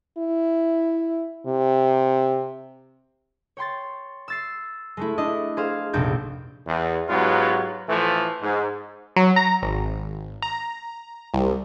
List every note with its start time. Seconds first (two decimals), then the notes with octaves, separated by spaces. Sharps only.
0.17 E4
1.46 C3
3.57 C#5 G5 C6 A6
4.28 E6 A6 C7
4.97 G#3 A3 E4
5.18 D4 E4 D#5
5.57 G#4 C5 F5
5.93 F1 A#1 C3 C4 G6
6.67 E2
7.09 G#2 F#3 B3 F4 G4
7.89 A2 E3 F3 A3
8.41 G#2
9.16 F#3
9.36 A#5
9.62 G#1
10.42 A#5
11.34 C2